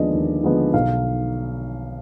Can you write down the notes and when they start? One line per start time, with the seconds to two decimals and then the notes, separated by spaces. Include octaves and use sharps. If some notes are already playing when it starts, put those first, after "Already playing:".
Already playing: D#2 D3 F3 G#3 B3 D5 D#5
0.13 D#2
0.43 D3 F3 G#3 B3
0.74 B1 F5